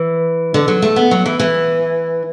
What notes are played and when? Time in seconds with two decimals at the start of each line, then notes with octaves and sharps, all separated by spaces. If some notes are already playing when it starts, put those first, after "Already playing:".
Already playing: E3
0.54 D3
0.68 F#3
0.82 A3
0.96 B3
1.11 F#3
1.26 E3
1.40 E3